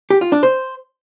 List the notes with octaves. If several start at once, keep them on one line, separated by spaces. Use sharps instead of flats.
G4
F4
D4
C5